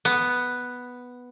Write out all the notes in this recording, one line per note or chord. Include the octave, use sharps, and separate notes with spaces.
B3